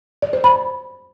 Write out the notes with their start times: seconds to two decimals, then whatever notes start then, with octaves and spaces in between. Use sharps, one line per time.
0.22 D5
0.33 C5
0.44 B5